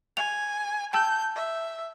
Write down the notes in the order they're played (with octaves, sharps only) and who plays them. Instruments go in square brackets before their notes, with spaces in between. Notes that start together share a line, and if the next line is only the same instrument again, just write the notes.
[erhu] G#5 [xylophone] F7
[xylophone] G5 A5 E6 [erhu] G6
[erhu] E5